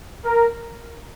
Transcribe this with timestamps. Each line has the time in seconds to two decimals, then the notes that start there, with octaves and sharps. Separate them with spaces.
0.24 A#4